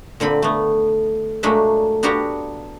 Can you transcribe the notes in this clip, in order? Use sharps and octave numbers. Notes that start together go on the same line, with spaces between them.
A#2 D3 C4 B5
A3 B3
A#2 F#3 G#3 A3 D4 E5
B3 D4 F#4 G4 F5 A#5